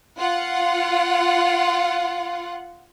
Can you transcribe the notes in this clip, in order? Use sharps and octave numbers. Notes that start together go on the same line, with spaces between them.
F4 F#5